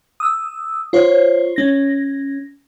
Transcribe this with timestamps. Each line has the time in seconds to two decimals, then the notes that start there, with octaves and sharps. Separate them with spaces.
0.20 D#6 E6
0.93 F4 C5 C#5
1.56 C#4 A#6